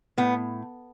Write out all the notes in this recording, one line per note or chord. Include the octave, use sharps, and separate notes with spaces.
A2 B3